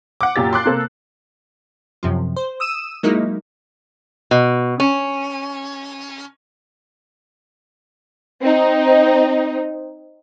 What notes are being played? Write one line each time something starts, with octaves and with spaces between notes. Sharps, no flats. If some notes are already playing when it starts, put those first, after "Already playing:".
F#5 D6
F#2 A#2 G4 A6
C6 D6 F#6 C7
C3 A#3 A4
F#2 C3 F3
C5
D#6 E6 D#7 E7
F#3 G#3 A#3 D#4 E4
B2
C#4
C4 D#4